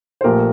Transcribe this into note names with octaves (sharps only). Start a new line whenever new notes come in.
C5
A#1 A#2 F3 A3 G4 A#4